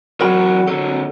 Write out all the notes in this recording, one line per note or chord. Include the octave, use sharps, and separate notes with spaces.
E2 F#3 F#4 A#4 G5 B5
F2 D3 F#3 A4